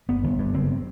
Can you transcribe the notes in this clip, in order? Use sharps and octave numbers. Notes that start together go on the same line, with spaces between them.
G1 B3
G1
G2
F#1 C4